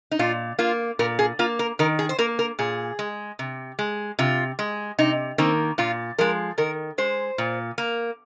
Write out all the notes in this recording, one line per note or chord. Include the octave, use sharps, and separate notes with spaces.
D#4
A#2 F4
A#3 F4
A#2 A#4
G#4
A#3 F4
A#4
D#3 A#4
G#4
C5
A#3 A#4
A#4
A#2 G#4
G#3
C3
G#3
C3 F4
G#3
C3 D#4
D#3 A#3 C4
A#2 F4
F3 G#3 A#4
D#3 A#4
G#3 C5
A#2
A#3